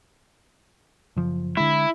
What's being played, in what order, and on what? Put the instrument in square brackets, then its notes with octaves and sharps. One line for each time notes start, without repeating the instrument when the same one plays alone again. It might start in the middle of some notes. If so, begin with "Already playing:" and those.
[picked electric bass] F#1 F3
[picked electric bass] D3 G#3 [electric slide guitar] E4